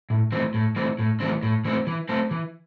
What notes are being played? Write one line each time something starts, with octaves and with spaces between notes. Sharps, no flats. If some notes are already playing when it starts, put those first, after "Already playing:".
A2
E3 A3 C4
A2
E3 A3 C4
A2
E3 A3 C4
A2
E3 A3 C4
E3
A3 C4
E3